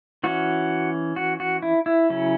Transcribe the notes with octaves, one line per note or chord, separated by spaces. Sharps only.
E3 C#4 F#4
F#4
F#4
E4
E4
C#3 F#3 C#4